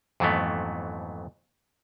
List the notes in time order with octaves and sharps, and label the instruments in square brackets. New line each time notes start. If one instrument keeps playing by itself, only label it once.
[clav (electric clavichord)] F2 G#2 E3 F#3 A3 B3